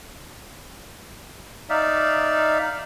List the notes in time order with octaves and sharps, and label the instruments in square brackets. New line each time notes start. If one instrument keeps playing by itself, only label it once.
[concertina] D#4 D5 E5 F5